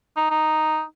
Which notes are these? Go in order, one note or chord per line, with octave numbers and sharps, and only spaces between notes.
D#4
D#4